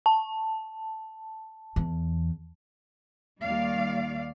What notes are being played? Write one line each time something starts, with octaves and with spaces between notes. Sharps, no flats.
A5
E2
D#2 D#3 G3 D5 F5